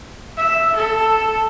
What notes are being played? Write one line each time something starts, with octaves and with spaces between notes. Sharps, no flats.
E5
A4